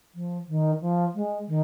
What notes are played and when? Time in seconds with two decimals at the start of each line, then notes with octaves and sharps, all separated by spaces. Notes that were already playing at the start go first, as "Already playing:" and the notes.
0.15 F3
0.48 D#3
0.81 F3
1.15 G#3
1.48 D#3